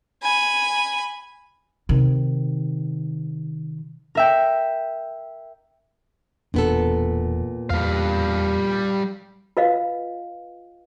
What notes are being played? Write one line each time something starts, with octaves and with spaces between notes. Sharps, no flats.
G#5 B5
C3 D#3
A#4 E5 G5
E1 E2 A#2 B3 D4 A4
E2 G3 F5
F4 B4 D#5 F5